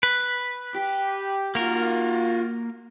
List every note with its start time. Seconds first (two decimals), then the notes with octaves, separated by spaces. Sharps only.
0.03 B4
0.75 G4
1.55 A#3 F4 F#4 A#4